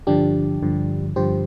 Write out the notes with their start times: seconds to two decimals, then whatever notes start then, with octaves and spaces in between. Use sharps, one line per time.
0.07 G2 D3 F3 D4 G4
0.63 G2 D3 F3
1.16 G2 D3 F3 G4 C5